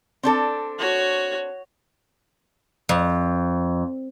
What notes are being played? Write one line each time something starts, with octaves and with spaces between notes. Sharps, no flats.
C4 D4 A4
F#4 C#5
F2